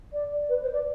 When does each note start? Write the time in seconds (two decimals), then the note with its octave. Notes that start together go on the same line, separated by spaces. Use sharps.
0.12 D5
0.48 B4
0.61 C5
0.72 D5